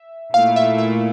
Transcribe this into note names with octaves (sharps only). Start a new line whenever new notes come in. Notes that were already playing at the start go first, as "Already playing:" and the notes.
Already playing: E5
A#2 A3 E4 F5
E5
E5